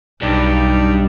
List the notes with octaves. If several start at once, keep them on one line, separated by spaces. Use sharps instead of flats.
B1 G2 D#4 D5